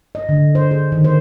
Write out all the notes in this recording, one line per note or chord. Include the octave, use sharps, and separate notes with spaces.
D#5
D3
C5
G#4
D#3
C5